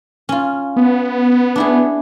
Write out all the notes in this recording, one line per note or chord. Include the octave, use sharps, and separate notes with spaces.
C#4 F4
B3
D4 E4 G#4